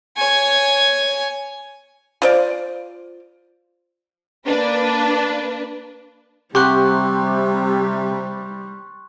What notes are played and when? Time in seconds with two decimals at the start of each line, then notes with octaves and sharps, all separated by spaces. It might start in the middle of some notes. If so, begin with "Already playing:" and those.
0.17 C#5 G#5
2.22 F4 C5 D5
4.47 A#3 D4 B4
6.55 C3 G3 G4 F#5 C6 C#6 F#6